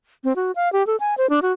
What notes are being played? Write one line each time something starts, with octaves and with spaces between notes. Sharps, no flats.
C4
F#4
F5
G4
A4
G#5
C5
D4
F#4